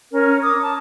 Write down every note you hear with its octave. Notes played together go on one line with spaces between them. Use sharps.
C#4 A#4
D6 D#6
A5